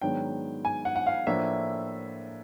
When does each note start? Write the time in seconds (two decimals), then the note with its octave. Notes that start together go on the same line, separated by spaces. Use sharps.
0.02 G#2 D#3 F#3 B3 D4 G5
0.65 G#5
0.85 F#5
0.96 F#5
1.07 F5
1.27 A2 F3 A#3 D4 E5